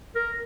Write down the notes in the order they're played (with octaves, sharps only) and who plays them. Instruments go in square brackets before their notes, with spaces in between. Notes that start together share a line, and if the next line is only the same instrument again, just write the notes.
[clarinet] A#4